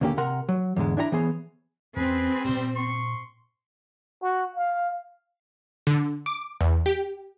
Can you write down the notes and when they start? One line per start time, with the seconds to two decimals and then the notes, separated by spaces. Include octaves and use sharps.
0.01 D#2 D3 A#3 C#4 G4
0.18 C3 A#4 F#5 A#5 C6
0.49 F#3
0.76 E2 G#2 D3 G#3
0.97 D4 E4 G4 A#5
1.12 E3 B3 G#4 C5 C#5
1.96 E2 C4 C#4 G#4 B4
2.44 G2 A#2 G3 C5
2.76 C6 C#6
4.22 F#4
4.55 F5
5.87 D3
6.26 D6
6.61 E2
6.86 G4